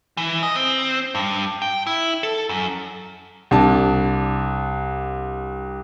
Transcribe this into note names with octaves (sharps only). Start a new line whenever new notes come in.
E3
D#5
C4
G2
G5
E4
A4
F#2
C2 D4 A5